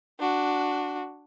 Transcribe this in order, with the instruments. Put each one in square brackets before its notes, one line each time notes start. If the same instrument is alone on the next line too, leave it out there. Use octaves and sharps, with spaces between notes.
[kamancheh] D4 F#4